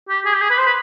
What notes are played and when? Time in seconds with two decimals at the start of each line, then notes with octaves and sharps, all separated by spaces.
0.09 G4
0.26 G#4
0.34 G4
0.41 G#4
0.51 B4
0.58 C5
0.66 B4